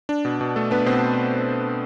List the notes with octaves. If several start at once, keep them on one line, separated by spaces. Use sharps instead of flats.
D4
B2
B2
A3 A4
B3 D4 B4
B2 C4 C5